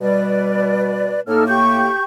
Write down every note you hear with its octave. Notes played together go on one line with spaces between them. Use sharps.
B2 G3 B4 D5
A2 A#3 D#4 A4 F6
G4 C#6 G6